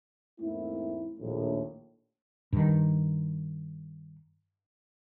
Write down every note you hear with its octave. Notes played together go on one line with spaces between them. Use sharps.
E2 G#2 A3 A#3 C4 E4
A#1 D#2 A2
G2 D#3